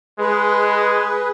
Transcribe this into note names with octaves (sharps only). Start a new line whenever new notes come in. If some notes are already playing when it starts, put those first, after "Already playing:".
G#3 G#4 B4